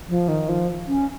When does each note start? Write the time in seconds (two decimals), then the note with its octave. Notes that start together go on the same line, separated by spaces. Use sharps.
0.09 F3
0.28 D#3
0.49 F3
0.88 C#4